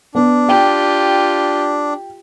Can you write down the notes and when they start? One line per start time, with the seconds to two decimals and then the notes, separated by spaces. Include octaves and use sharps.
0.15 B3 D4
0.49 F4 G4 G5